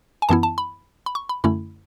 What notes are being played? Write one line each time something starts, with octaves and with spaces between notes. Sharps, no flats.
G#5
F#2 E3 B3 E4 A5
A5
B5
B5
C#6
B5
F#2 D3 A3 C#4 E4 B5